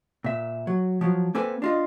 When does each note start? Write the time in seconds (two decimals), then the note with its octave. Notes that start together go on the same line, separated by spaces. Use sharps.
0.24 A#2 E5
0.67 F#3
1.01 F3 F#3
1.35 A#3 C4 A4 B4 G#5
1.62 D4 F4 D#5